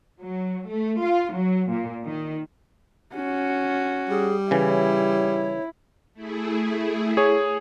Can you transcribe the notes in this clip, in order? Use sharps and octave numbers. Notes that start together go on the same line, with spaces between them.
F#3
A3
F4
F#3
A#2
D#3
C#4 F#4
G3 G#4
C#3 E3 E4 C#5
A3 E4 G#4
G#4 C#5